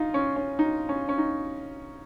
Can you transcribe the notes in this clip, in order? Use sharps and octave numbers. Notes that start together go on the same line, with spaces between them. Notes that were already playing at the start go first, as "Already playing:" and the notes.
Already playing: D#4 F4
C#4
C#4
D#4
C#4
C#4
D#4